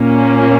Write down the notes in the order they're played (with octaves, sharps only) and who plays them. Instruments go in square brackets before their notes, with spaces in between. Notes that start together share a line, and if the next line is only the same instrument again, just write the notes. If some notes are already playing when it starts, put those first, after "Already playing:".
Already playing: [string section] A#2 A#3 C#4